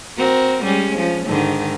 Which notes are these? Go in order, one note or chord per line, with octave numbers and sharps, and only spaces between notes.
C4 F#4 A#4
G3 G#3 C#4
F3 C#4
G#2 D3 D#3